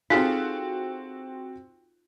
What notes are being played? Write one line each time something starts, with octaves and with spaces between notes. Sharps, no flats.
C4 D#4 F4 F#4 G#4 A4 F#6